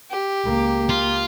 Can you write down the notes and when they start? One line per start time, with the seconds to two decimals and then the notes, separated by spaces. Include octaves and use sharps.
0.11 G4
0.44 C#2 A#3
0.89 F4